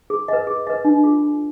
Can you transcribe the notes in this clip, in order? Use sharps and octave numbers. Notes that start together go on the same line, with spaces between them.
G#4
B4 D#5
G#4
B4 D#5
D4
F4 G#4
D4